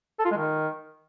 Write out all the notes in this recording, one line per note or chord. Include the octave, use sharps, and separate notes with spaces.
A4
F4
G#3
D#3